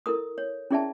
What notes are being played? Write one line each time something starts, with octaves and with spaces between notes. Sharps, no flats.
E4 A4 A#4 D#6
C#5
C#4 E4 G#4 D5 E5 A5